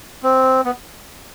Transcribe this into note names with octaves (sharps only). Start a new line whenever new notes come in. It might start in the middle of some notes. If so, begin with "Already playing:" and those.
C4
B3